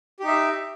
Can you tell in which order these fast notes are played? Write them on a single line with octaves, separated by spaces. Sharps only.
G4 D#4 E5